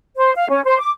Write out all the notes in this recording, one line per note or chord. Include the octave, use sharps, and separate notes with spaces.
C5
F5
C#4
C5
D6